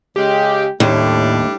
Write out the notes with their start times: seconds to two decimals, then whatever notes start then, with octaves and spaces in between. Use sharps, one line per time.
0.16 C#3 G#3 G4
0.80 D#2 A2 G3 A3 D4